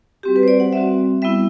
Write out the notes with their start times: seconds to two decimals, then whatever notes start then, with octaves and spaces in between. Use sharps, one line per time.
0.23 G3 C4 F#4 G4
0.36 B4
0.43 C5
0.48 D5
0.60 F#5
0.73 G3 C4 F#4 E5
1.22 G3 B3 E4 E5